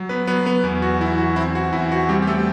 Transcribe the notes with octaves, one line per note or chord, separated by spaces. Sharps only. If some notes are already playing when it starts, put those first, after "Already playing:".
Already playing: F#3
B3 B4
F#3 B3 B4
B3 B4
E2
F#4
E3 E4
F#4
C4 E4
F#4
E2 E4
F#4
G3 C4 G4
G4
A3 A4